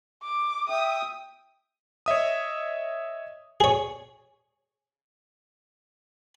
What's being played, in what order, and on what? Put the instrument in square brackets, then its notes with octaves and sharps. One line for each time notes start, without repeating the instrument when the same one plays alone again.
[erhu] D6
[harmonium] E5 G5 [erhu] D#6
[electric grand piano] C#5 D#5 E5 D#6
[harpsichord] G#4 C#5